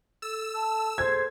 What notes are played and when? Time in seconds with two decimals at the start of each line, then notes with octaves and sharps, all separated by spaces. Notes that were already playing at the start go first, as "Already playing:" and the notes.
0.22 A4 E6
0.55 A5
0.98 G#4 A4 C5 G#6